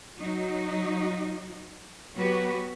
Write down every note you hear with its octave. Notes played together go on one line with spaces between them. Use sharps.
F#3 D#4 F#4
F#3 B3 F#4 G4 B4